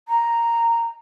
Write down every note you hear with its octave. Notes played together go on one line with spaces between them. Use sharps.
A#5